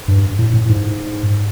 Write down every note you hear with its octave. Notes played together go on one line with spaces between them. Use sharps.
G2
A2
A2
G#2